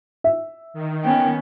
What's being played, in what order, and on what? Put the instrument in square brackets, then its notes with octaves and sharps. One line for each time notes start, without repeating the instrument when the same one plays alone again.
[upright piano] E5
[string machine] D#3
[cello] B3 C#4 [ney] G5